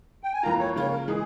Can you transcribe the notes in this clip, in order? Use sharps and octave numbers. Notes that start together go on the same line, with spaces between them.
G5
G#5
F2 E3 A#3 F4 A#5
C#5
C#3 F3 A#3 F4 C#5
A#4
E3 G#3 G#4